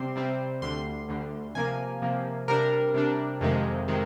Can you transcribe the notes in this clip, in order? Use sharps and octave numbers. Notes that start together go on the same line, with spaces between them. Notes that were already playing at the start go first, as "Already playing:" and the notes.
Already playing: C3 G3 C4 C6
C3 G3 C4
D2 D3 G3 C6
D2 D3 G3
C3 F3 A#3 G#5
C3 F3 A#3
C3 G3 D4 A#4
C3 G3 D4
F2 C3 D#3 G#3
C3 D#3 G#3